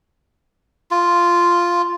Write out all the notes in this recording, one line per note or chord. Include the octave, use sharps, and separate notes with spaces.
F4